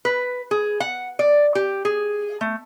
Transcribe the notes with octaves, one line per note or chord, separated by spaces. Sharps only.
B4
G#4
F#5
D5
G4
G#4
A3